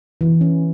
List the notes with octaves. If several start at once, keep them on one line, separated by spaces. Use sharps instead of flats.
E3
C#4